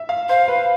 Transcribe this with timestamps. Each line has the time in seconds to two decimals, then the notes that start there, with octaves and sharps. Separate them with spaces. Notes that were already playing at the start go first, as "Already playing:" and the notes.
Already playing: E5
0.09 F5
0.29 C5 F5
0.48 B4